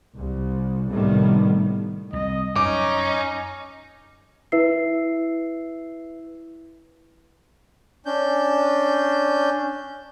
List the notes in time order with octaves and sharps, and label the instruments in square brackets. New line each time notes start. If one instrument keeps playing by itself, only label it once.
[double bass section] C2
A2 C3 D#3 G3 A3 B3
[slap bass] C2 [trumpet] D#5
[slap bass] F#2 [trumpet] C#4 [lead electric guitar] D#4 [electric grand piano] D6
[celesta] E4 B4 E5 E6 C7
[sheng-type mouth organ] C#4 D4 G6